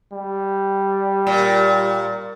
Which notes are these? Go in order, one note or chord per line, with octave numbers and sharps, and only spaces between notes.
G3
A#2